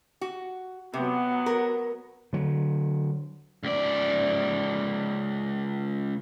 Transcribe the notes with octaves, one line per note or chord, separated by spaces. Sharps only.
F#4
C3 F#3 B3
A#4
D3 F#3
C#2 D5